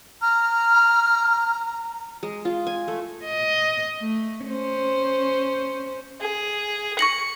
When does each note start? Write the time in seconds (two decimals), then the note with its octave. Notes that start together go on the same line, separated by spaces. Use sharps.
0.22 A#5 F6
2.23 G#3
2.45 F4
2.67 G#5
2.88 A3
3.25 D#5
4.00 A3
4.49 C#4 C5
6.21 G#4
6.99 C#6 A#6 C#7 F#7